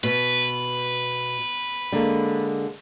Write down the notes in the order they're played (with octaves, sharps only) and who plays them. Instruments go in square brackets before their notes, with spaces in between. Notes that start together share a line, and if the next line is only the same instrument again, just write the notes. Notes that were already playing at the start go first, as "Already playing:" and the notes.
[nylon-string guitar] B2 [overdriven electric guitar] B4
[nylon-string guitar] D3 G#3 A#3